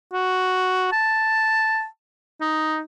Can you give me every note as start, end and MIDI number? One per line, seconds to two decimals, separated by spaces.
0.13 0.92 66
0.92 1.86 81
2.41 2.80 63